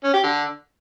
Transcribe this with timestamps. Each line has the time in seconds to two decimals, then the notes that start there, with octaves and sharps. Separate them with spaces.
0.04 C#4
0.14 G4
0.23 D3